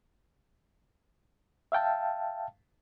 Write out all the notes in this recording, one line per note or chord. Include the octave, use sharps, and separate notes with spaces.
E5 F5 G5 A5